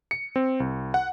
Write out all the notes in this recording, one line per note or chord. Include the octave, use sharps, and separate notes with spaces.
C#7
C4
C2
F#5